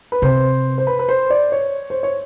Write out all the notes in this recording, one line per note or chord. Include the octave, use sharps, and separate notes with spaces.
B4
C3 C5
C5
B4
B4
C5
D5
C#5
C5
C#5